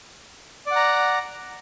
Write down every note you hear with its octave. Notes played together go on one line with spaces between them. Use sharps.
D5 F#5 A#5